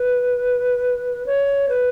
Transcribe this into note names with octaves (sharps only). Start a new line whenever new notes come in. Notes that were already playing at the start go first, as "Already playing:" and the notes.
Already playing: B4
C#5
B4